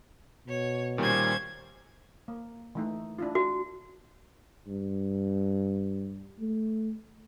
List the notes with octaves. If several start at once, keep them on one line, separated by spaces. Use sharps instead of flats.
B2 C#5
A#2 D#3 G3 C#4 C5 G#6
A#3
E3 A3 D#4
D4 E4 F4
F#4
G2
A3